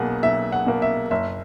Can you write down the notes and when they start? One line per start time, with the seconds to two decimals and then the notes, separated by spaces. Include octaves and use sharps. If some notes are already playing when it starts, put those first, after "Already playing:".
Already playing: B1 B2 A#3 G#4 F#5
0.23 B1 E5
0.52 F#5
0.67 B2 A#3
0.82 E5
1.11 F#1 E5